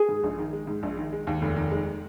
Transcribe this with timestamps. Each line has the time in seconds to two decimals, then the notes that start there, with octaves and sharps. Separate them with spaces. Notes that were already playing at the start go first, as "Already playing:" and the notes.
Already playing: G#4
0.09 G#2
0.24 A#1
0.39 D#3
0.53 G#3
0.67 G#2
0.83 A#1
0.97 D#3
1.13 G#3
1.27 D#2
1.42 F1
1.56 D#3
1.71 G#3